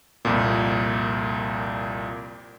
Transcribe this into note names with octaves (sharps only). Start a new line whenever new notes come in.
C2 F2 A#2